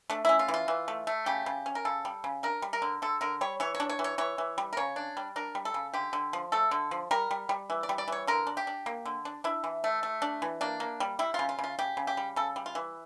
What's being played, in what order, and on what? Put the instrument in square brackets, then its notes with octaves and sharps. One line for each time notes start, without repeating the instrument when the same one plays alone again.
[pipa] A3 D4
C#4 E4
F4
E3
F4
E3
A3
A3
C#3 G4
C#3
C#4
A#4
C#3 A4
G3
C#3
D4 A#4
G3
A#4
D3
D3 A4
D3 A#4
G3 C#5
E3 C#5
C#5
D4
C#5
E3
C#5
E3 C#5
E3
G3
A#4
C#3 C#5
D4
G3
D4 A#4
G3
A4
C#3
D3 G4
D3
F3
A3 A4
D3
F3
G3 A#4
G3
G3
E3
D5
G3
D5
E3 C#5
D3 A#4
D4
G4
D4
A#3
D3
D4
D4 E4
E3
A3
A3
D4
E3
A#3 D4
A#3
G3
G3 E4
C#3 F4
F4
C#3
F4
C#3 G4
C#3
G4
G3
C#3 A4
G3
F4
E3